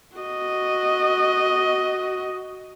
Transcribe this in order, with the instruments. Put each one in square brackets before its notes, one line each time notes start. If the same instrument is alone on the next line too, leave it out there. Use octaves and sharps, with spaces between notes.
[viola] F#4 D#5